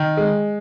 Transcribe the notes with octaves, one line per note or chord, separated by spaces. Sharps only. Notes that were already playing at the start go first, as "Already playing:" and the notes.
Already playing: D#3
G#3